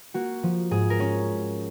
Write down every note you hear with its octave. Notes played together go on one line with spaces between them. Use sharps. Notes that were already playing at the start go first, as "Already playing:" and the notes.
A#3 F#4
F3
G#2 G#4
A#4
C#4